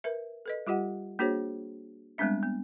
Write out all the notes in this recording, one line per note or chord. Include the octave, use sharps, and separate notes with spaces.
A#4 B4 E5
A4 B4 D#5
G3 F4 G4 D#5 F#5
A#3 D4 F#4 G#4 C5 C#5
G3 G#3 B3 C4 D4 E5
B3